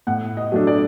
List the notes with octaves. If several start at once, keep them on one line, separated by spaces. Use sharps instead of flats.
A2 F#5
D#5
F#3 A3 D4
D5